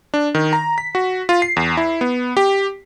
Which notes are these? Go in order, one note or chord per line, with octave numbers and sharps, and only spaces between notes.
D4
D#3
A#5
B6
F#4
F4
C7
E2
E4
B3
G4